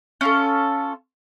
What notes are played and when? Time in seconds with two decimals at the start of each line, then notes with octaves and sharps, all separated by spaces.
0.21 C#4 F4 A4